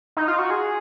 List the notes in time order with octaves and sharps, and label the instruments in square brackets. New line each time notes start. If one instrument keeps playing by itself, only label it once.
[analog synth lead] D#4
F4
F#4
G#4